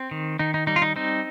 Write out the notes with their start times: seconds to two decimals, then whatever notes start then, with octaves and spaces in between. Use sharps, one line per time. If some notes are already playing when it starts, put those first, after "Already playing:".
Already playing: C4
0.11 D#3
0.39 D#3 D#4
0.54 D#4
0.67 G3 D#4
0.76 F4
0.82 D#4
0.96 C4 D#4